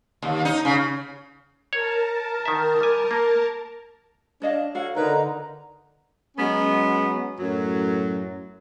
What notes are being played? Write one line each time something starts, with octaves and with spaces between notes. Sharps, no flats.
D#2
D#4
C#3
A#4 C#5 A5
D#3 E5
G3 G#5
A#3
D4 C#5 D#5 F5
F#4 A4 C#5 F5
D3 D#4 A#4 B4 C#5 G5 A#5
F#3 G#3 B3 C#4
F#2 A2 F#3